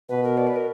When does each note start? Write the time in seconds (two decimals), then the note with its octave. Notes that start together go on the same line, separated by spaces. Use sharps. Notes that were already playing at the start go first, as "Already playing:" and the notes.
0.09 B2 B4
0.23 A#4
0.38 D5
0.47 B4
0.56 A#4